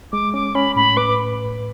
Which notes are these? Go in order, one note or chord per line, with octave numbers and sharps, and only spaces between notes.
G#3 D6
C#4 D6
C#4 B5
A2 B5
B4 D6